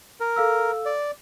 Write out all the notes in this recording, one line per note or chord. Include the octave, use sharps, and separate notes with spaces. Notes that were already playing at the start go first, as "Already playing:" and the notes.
A#4
A4 F5 E6
D5